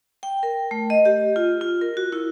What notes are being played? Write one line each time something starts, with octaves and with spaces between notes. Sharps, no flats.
G5
A#4
A3
D#5
G4
F4
F4
A#4
F#4
E4